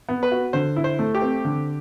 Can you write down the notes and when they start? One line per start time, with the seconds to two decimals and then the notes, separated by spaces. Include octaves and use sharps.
0.09 B3
0.23 B4
0.31 F#4
0.53 D3 C5
0.76 E4
0.84 C5
0.99 A3
1.15 G4
1.22 C4
1.45 D3